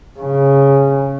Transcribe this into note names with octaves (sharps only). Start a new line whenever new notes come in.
C#3